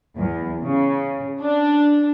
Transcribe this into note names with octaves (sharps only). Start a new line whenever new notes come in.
E2
C#3
D4